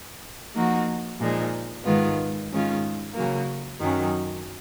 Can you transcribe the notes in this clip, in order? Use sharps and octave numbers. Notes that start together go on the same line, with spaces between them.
F3 A#3 D#4 F#4
A#2 F3 G#3 D#4
G#2 D#3 G#3 B3 F4
G#2 D#3 G#3 C#4 F4
C#3 F#3 A#3
F#2 D#3 F#3 C#4